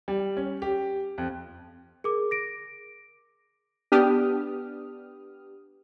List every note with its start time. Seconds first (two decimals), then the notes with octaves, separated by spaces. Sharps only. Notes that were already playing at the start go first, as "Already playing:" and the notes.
0.08 G3
0.37 C#4
0.62 G4
1.18 F2
2.04 G#4 A#4 D6
2.31 A#6 D7
3.92 B3 D4 G4 D#6 F6